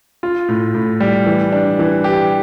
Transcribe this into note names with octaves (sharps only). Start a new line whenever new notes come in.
F4
A2
A2
G3
E3
D4
E3
G4